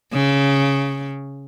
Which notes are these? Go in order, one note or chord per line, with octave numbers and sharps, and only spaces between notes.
C#3